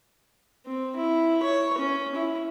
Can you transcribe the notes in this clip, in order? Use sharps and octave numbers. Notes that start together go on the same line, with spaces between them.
C4
E4
C#5
C#4
E4